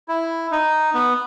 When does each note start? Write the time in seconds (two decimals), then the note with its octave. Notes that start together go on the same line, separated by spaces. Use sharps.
0.08 E4
0.52 D#4
0.94 B3